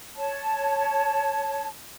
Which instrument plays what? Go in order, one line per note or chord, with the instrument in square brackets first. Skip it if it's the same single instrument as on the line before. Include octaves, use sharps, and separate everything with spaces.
[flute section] C#5 A5